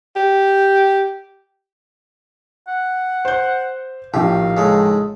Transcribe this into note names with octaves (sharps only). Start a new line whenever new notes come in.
G4
F#5
C5 G6
A#1 A2 D#3 G4 F5
C#3 G#3 A3